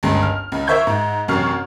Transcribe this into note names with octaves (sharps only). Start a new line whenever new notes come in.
G1 C#2 G#3
F6
C#2
A#4 C5 E5 C#6 G6 G#6
G#2
A1 F#2 C3 C#6 F6 C7